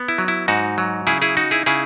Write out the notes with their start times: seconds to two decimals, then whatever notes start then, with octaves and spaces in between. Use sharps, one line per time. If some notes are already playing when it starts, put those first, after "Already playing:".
Already playing: B3
0.08 E4
0.18 F#3
0.28 E4
0.48 G#2 D#4 F#4
0.78 F#3
1.07 C#3 E4 G#4
1.22 E4 G#4
1.37 D#4 F#4
1.51 E4 G#4
1.66 C#3 E4 G#4